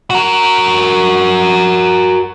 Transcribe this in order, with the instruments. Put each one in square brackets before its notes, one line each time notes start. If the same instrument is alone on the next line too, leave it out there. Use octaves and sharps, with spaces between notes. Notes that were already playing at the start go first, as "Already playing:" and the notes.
[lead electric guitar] F#4 A#4